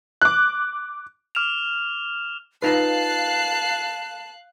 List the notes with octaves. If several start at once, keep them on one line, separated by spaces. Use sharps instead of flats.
D6 F#6
D6 F6 E7 F7
D#4 F4 B4 F5 A5 F#6 C7